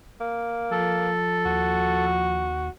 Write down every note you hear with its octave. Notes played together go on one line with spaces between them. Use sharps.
A#3
F3 A4
D#2 F#4